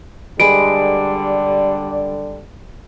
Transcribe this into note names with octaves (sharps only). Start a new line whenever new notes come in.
D3 G3 G#3 B4 D5 D#5 D7